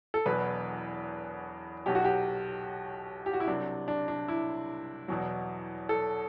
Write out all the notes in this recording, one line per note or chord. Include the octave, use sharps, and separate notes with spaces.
A4
E1 E2 B2 F#3 B4
B1 B2 F#3 G4
F#4
G4
G4
F#4
E4
C2 C3 F#3 D4
D4
D4
E4
E2 B2 F#3
A4